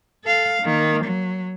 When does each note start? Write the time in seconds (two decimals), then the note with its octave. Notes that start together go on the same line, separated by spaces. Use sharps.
0.24 A4 F5
0.62 D#3 A#3
1.04 F#3